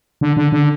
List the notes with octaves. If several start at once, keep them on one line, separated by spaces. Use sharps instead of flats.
D3
D3
D3